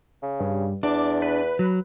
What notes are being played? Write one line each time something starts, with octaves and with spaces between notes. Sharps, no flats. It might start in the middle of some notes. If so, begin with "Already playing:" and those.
C#3
G2
E2 D4 D6
B4
F#3